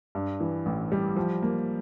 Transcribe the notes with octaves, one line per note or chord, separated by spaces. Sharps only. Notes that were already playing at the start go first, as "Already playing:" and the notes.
G2
E3
A1
G3
F3
A#3